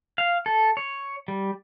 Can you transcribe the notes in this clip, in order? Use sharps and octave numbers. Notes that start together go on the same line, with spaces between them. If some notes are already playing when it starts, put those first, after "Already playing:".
F5
A4
C#5
G3